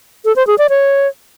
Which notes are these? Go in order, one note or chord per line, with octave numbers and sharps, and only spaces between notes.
A4
C5
G#4
D5
C#5